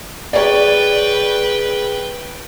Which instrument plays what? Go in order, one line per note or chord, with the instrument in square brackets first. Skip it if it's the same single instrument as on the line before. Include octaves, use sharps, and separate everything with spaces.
[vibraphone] G#4 [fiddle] B4 G5 [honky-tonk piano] C#5 D5